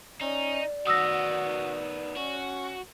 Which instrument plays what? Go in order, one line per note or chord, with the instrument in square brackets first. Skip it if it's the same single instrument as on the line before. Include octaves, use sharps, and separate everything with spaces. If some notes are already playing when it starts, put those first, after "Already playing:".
[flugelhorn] C#4 [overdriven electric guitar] D#4 [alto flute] D5
[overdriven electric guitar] D#3 B3 [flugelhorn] F#4 [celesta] D#6 E6 A#6
[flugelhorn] C#4 [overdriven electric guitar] F#4